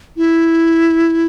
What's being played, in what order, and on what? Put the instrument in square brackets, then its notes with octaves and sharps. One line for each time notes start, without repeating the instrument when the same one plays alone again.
[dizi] E4